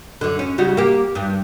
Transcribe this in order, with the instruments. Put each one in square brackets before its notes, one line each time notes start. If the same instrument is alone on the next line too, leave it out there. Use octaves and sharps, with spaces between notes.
[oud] F#2 D3
C#4
C#3 G3 F#4
A#3 G4
G2